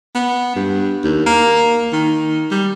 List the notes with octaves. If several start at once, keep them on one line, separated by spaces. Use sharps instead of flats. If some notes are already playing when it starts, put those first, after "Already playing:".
B3
G2
D#2
A#3
D#3
G3